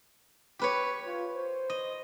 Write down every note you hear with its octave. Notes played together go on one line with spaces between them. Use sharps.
G4 B4 C#5
F4
C5
D#5